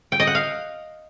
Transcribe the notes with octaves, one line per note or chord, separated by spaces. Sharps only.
G5
D#5
F#5
F5